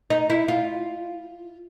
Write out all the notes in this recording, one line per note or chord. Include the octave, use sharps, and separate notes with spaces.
D#4
E4
F4